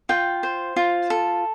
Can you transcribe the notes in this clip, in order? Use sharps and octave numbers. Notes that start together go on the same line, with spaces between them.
F4 G5
C5
F4
A4